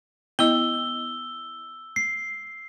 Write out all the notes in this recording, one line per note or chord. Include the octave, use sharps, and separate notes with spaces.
B3 E4 D#5 E6 G7
C7